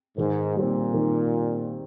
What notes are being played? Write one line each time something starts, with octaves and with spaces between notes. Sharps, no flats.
G#2 D#3
A#2 G3 C4
D#3